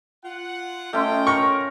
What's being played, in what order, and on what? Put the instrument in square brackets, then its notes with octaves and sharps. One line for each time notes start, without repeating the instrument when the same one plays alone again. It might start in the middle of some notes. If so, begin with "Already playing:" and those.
[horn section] F4 F#5
[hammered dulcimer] A3 C#4 C6 [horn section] F4 D#5 G5
[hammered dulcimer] A#4 C#5 [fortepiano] C#6